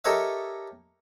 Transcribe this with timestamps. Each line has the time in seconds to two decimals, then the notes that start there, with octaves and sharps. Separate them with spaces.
0.05 G4 A4 A#4 C#5 D#5 E5